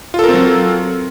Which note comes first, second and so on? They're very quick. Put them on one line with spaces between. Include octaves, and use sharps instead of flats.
F4 A4 A#4 C4 F#3